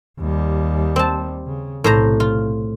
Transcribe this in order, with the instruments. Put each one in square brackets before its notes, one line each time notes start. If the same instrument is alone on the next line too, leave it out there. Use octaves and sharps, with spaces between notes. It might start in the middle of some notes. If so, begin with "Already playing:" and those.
[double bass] D#2 G3
[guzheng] C4 A5
[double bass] C#3
[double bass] B1 C3 [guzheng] A2 C5 A#5
[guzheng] F4